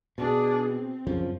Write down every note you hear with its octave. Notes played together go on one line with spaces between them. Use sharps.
B2 D4 G#4
C4
F#2 C#3 F3